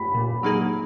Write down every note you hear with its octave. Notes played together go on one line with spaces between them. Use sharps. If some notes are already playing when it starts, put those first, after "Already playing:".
Already playing: B5
A#2
F#3 A#3 D#4 G#4